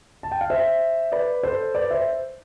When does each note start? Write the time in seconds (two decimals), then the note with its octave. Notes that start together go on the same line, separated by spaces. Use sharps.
0.23 A5
0.32 G5
0.41 F5
0.50 C5 E5
1.12 B4 D5
1.43 A4 C5
1.75 B4 D5
1.90 C5 E5